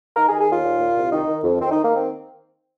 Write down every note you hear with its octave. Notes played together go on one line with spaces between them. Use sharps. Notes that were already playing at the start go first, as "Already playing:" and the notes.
D#3 A#4
G#4
D#3
G#4
D#2 F4
A#2
A#2
C2
D#3 D#4
D#3
F2
D#3 C4
D#3 D#4
A#3
C4